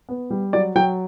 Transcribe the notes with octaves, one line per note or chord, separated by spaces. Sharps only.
B3
G3
F#3 D5
F#3 G5